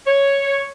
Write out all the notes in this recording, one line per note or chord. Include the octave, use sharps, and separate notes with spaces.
C#5